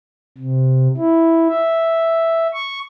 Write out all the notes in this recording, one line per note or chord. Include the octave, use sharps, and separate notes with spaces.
C3
E4
E5
C#6